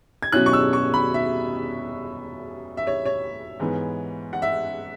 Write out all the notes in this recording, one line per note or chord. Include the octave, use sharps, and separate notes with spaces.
G#6
B2 F#3 C#4 E4 F#6
C#6
E6
C#6
B5
E5
E5
C#5
C#5
G#2 E3 B3
F#5
E5